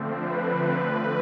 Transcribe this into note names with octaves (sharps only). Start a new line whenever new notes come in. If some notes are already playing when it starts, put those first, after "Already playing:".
Already playing: D3 F3 A3 C4
B4